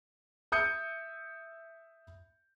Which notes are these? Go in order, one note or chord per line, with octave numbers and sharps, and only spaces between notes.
E5 D#6 G6 C#7